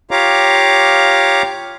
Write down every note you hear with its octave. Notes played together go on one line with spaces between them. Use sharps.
F4 G4 C#5 F5 A#5 D6